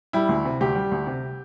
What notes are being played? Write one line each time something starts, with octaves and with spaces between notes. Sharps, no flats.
G3 E4
D2
C3
D2 G4
G3
D2
C3